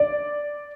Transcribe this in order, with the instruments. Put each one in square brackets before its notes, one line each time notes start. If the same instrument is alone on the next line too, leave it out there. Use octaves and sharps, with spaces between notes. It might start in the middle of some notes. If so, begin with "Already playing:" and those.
Already playing: [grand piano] D5